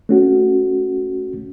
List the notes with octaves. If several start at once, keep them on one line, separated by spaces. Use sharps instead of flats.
A3 C#4 F#4